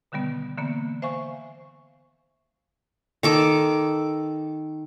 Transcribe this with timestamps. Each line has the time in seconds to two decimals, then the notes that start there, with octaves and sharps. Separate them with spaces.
0.12 B2 D3 D#3 G3 B3
0.57 D3 E3 A#3 B3
1.02 C5 E5 F5 G#5 C#6
3.23 D#3 A4 D6